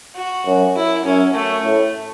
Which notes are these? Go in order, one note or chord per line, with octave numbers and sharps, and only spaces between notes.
F#4
F#2
E4
F#2 C#4
A3
A2